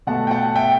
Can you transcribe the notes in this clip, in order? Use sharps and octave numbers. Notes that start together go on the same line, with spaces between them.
B2 A3 F#5 A5
G5
F#5 A5
E5 G5